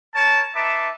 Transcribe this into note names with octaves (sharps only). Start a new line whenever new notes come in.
A#4 C#5 A5
D#4 B4 E5 A5 D6